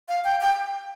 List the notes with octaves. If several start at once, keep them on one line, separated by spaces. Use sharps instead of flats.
F5
G5
G5